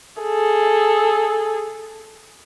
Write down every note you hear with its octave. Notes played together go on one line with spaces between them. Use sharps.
G#4 A4